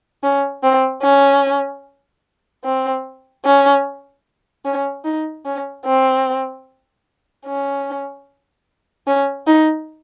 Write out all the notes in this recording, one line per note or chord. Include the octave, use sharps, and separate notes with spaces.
C#4
C4
C#4
C4
C#4
C#4
D#4
C#4
C4
C#4
C#4
D#4